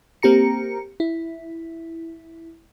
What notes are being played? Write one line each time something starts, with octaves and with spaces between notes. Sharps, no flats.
A#3 C4 G4 A#5 C#7
E4